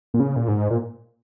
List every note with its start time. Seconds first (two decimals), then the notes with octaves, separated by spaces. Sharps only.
0.14 A#2
0.20 C#3
0.36 A#2
0.48 G#2
0.71 A#2